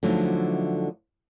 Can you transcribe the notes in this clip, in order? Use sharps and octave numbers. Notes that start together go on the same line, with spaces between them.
D3 F3 F#3 A3 D#4 E4